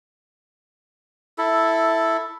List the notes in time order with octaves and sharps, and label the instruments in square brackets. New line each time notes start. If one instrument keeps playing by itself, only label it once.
[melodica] E4 A4